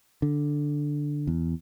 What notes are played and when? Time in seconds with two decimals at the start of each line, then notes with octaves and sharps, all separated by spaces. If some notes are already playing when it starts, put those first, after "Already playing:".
0.22 D3
1.27 E2